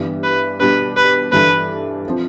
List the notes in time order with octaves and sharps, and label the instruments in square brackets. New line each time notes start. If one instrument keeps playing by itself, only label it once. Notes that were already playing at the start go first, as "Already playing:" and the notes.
Already playing: [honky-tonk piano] G2 E3 G3 B3
[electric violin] B4
[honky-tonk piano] B2 G3 D4 G4 [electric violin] B4
[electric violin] B4
[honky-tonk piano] G2 E3 G3 D4 A4 [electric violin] B4
[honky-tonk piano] F3 C4